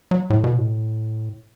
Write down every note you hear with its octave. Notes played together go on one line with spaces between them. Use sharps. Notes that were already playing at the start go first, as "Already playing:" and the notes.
F#3
A2
B2
A2